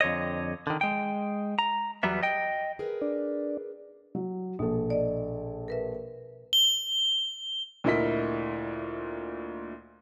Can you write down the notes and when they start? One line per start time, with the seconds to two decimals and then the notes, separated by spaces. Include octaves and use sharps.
0.01 F2 D3 C#5 D#5
0.67 D3 D#3
0.81 G#3 G5
1.59 A#5
2.03 E2 F#3 G3 B3 E5
2.23 D#5 G5
2.79 G#4 A#4 B4
3.02 D4
4.15 F#3
4.59 A#1 B2 A4
4.90 D5 D#5
5.68 A#4 B4 E5
6.53 G7
7.84 D2 A#2 E4 A#4 D#5 B6